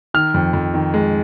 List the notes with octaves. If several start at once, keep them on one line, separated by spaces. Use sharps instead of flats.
D#3 F6
F2
F2
D#3
G#3